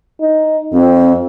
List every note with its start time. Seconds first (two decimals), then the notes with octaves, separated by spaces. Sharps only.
0.21 D#4
0.73 F2 C4